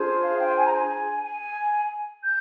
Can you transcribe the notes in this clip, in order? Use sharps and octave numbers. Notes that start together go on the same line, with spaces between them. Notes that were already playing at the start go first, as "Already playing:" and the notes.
Already playing: D4 F4 G#4 C5
F5
G5
G#5
A#5
G#5
G#5
G6